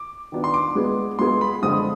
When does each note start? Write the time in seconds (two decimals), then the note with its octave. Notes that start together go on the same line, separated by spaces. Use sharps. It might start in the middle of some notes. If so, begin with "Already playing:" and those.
Already playing: D6
0.32 D#3 B3 D4 F4
0.44 C6
0.54 D6
0.75 G#3 B3 F4 G#4
1.19 G#3 B3 F4 G#4 C6
1.41 B5
1.62 D3 F3 G#3 C4 F4 D#6